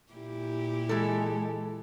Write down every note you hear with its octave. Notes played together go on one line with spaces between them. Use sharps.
A#2 E4 G4
E3 G#3 A4